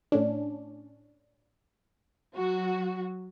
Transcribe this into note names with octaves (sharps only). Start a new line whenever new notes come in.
A2 C#4 D4
F#3 F#4